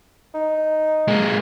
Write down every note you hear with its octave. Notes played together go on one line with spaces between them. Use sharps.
D#4
G#3 A#3